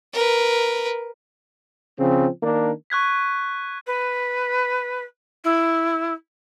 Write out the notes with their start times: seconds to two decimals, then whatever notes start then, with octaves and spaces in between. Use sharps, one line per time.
0.14 A#4 B4
1.98 C#3 F3 C4
2.41 D#3 A#3 D4
2.90 C#6 F#6 G#6 B6
3.87 B4
5.44 E4